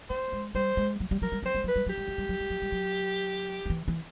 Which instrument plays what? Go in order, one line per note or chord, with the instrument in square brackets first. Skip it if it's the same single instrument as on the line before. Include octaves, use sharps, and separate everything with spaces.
[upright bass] A3 [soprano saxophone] C5
[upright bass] G#3
[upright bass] G3 [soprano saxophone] C5
[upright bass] G#3
F#3
G3
[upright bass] F#3 [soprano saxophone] A#4
[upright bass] G3
[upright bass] F#3 [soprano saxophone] C5
[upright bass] G3
[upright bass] F#3 [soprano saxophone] B4
[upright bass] G3
[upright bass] F#3 [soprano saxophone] G4
[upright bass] G3
F#3
G3
F#3
G3
F#3
G3
F#3
F3
E3
E3